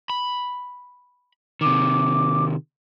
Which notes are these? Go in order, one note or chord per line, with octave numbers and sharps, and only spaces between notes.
B5
C3 D#3 D6